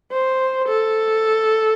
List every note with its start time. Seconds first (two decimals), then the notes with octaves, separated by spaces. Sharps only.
0.12 C5
0.68 A4